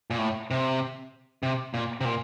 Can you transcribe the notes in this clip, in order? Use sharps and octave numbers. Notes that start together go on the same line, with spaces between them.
A#2
A2
C3
C3
A#2
C3
A#2